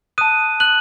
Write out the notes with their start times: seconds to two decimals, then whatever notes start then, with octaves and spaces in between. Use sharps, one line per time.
0.18 A5 D#6 F#6 D#7
0.60 F#6 F#7